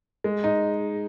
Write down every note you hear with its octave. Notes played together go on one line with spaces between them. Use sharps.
G#3
D#4